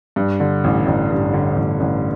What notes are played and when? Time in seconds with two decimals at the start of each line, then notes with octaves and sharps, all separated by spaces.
0.16 G2
0.40 D3
0.64 A1
0.86 A1
1.10 G2
1.33 D3
1.56 A1
1.80 A1